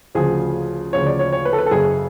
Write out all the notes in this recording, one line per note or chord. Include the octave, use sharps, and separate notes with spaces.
D2 C#3 F3 G#4
D2 C#3 F3 C#5
D5
C#5
C#5
B4
A4
B4
A4
F#1 F#2 C#3 G#4